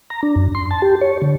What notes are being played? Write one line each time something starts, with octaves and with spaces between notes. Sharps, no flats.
A#5
D4
F#2
C6
A5
G4
C#5
D3